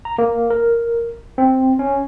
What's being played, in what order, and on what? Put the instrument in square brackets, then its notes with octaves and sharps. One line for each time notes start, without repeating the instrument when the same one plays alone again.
[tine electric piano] A#5
A#3
A#4
C4
C#4